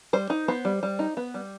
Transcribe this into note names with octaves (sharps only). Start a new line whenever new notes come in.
G3 C5
D#4
B3 C5
G3
G3
D#4
B3
G3